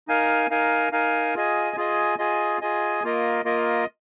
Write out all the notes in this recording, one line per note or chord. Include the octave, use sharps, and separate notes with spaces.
D#4 A#4 F5 G#5
D#4 A#4 F5 G#5
D#4 A#4 F5 G#5
F4 G#4 D#5 G#5
F4 G#4 D#5 G#5
F4 G#4 D#5 G#5
F4 G#4 D#5 G#5
A#3 F4 A#4 D#5
A#3 F4 A#4 D#5